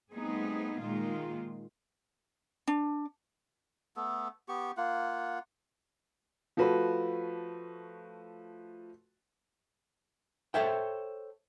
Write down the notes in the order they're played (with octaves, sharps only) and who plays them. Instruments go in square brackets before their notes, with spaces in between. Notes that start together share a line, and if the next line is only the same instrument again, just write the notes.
[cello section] G3 A3 B3 C4 D#4 G#4
A#2 D#3 G#3 A#3 F4
[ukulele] D4
[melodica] A3 B3 A4
B3 G4 C#6
A#3 F4 F#5
[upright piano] F3 A3 F#4 B4
[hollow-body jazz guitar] A4 C5 C#5 E5 G5